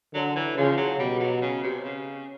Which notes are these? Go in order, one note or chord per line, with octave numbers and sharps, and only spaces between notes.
D3 F#3
E3
C#3 F3
F#3
B2 G3
F#3
C#3
C3
C#3